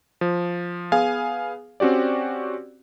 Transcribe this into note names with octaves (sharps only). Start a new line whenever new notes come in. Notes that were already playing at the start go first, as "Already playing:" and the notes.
F3
B3 G#4 F5 G#5
C4 C#4 F#4 G4 D5